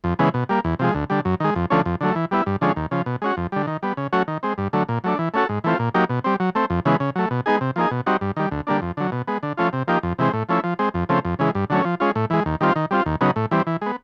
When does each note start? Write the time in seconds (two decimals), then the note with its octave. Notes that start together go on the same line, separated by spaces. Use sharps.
0.04 F2
0.19 C#3 E3 G#3 B3
0.34 B2
0.49 G3 A#3
0.65 E2
0.79 C3 F3 G#3
0.95 D2
1.10 D3 G3
1.25 F#2
1.40 D#3 G#3
1.55 F2
1.70 D3 F3 A3 C#4
1.86 F2
2.01 D3 F#3 A3
2.15 E3
2.31 G3 B3 E4
2.46 G2
2.61 D3 F3 G#3 C#4
2.76 D#2
2.91 C#3 F3
3.06 B2
3.22 G#3 C#4 F#4
3.37 F2
3.52 D3 G3
3.67 D#3
3.83 G3 B3
3.97 C#3
4.13 F#3 A3 C#4 F#4
4.28 D#3
4.43 G#3 C4
4.58 G2
4.73 D3 F#3 A3
4.89 A#2
5.04 F#3 A3 D4
5.19 E3
5.34 A3 C#4 F#4 A4
5.49 G#2
5.64 E3 A3 C4 F4
5.79 A#2
5.94 F#3 A#3 D#4 G4
6.09 B2
6.24 G3 C4
6.40 F#3
6.55 A3 C4
6.70 F2
6.85 C#3 E3 G#3 B3
7.00 C#3
7.16 F#3 A3
7.31 B2
7.46 G#3 B3 D#4 G#4
7.61 C3
7.76 F3 A#3 D#4 G#4
7.91 B2
8.06 G3 C4 D#4 F#4
8.21 G2
8.37 D#3 G3
8.51 D2
8.67 D3 G3 A#3 D4
8.82 F2
8.97 D3 F#3
9.12 B2
9.27 G#3 B3
9.43 D3
9.57 F3 A3 C#4 F4
9.73 C3
9.88 F3 A#3 D#4 G4
10.03 F2
10.18 C3 E3 G#3 C4
10.33 A2
10.49 F3 A3 C#4 E4
10.64 F3
10.79 G#3 C4
10.94 F2
11.09 C#3 F3 A3 C4
11.25 F2
11.39 C#3 E3 G#3
11.55 G2
11.70 D3 F#3 A3 C#4
11.85 F3
12.00 G#3 C#4 F4
12.15 A2
12.30 E3 G#3
12.46 D#2
12.61 D#3 G3 C4 F4
12.76 D#3
12.91 G3 C4 F4
13.06 D#2
13.21 C#3 F#3 B3 D#4
13.36 A2
13.51 E3 G3 C4
13.67 E3
13.81 G#3 B3